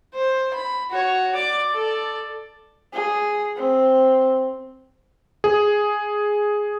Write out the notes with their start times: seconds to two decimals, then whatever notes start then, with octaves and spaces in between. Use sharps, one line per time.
0.14 C5
0.54 B5
0.91 F#4 C#5
1.35 D5 D6
1.73 A4 D5
2.93 G#4
3.57 C4
5.44 G#4